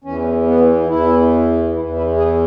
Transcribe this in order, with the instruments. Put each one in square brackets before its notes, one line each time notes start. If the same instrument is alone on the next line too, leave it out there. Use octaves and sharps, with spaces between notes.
[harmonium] E2 E3 C#4
B3
E2 E3 E4
E2 E3 E4
E4
G#4